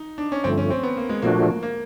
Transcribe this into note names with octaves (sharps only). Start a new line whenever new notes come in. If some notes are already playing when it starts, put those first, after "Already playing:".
Already playing: D#4
D4
C#4
G2 D3 F3 A3 C4
C#4
C4
B3
A#3
G#3
A#2 F3 A3 A#3 D4 F#4
A#3